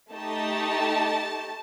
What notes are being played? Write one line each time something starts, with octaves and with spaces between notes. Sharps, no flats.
A3 D#4 G4 A5